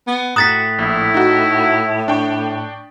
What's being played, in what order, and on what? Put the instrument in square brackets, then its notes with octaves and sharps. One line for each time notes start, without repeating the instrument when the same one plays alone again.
[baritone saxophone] B3
[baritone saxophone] A2 [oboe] F#4 [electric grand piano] A#5 F#6 E7 [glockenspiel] D#6 A6 B6
[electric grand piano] A#1 [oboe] E4
[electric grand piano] D#4 F#4
D4 G5 C#6